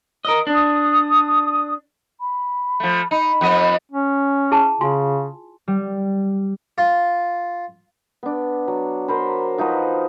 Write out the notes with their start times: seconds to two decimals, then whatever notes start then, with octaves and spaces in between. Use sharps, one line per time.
0.25 A#4 D#5
0.47 D4 D#6
2.20 B5
2.80 F3 A3
3.11 D#4 B5
3.41 F2 B3 D#5
3.92 C#4
4.51 E4 G#4 A5
4.81 C#3 F4 G#5 C6
5.68 G3
6.78 F4
8.23 B3 D4
8.68 F#3
9.08 A#4 C5 B5
9.58 F3 D#4 F#4 B4